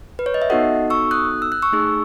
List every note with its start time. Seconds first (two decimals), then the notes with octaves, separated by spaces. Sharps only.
0.19 B4
0.26 C#5
0.34 D#5
0.42 E5
0.50 B3 D#4 F#4 A4 D#5 F#5
0.90 C#6 E6
1.11 D#6 F#6
1.42 E6
1.52 F#6
1.62 C#6 E6
1.72 A3 D#4 G#4